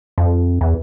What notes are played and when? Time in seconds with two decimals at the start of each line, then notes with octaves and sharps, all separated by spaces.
0.18 F2
0.61 E2